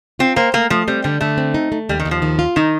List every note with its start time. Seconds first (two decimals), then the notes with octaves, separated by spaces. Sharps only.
0.19 C4 F4
0.36 A#3 C5
0.54 A3 A#3
0.70 F3 A3
0.88 G3 C4
1.04 D3 G3
1.21 D3 A3
1.38 C4
1.54 D#4
1.72 A3
1.89 D#2 G3
1.99 D#3
2.05 D#2
2.11 F3
2.22 D#3
2.39 F4
2.56 D#3 D#4